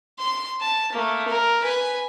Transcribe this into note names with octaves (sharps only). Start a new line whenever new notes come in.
C6
A5
A3 A#3
A#4
B4 G#5